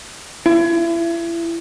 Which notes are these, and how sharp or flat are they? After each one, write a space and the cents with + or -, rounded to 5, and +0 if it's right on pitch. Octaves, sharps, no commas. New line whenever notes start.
E4 +35